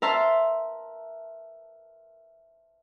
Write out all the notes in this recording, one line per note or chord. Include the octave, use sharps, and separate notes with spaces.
A#4 E5 A5 C6